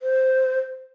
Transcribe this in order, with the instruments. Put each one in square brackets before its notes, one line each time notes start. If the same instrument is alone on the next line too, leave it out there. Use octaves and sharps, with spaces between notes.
[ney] C5